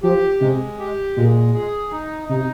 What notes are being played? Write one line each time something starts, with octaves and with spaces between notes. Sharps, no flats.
F3 G4
C3 G#3
G4
A#2 G#3
G#4
D#4
C3 D#4